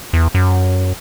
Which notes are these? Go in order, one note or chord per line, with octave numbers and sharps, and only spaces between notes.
E2
F#2